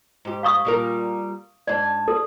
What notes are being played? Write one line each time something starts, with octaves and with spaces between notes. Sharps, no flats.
G#2 G4
F5 C#6 D#6
A#2 G3 A#4
G#2 D4 D5
A4